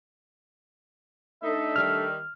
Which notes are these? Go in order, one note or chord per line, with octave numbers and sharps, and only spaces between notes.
A3 D4 D#4 A4 E5
D#3 G3 F6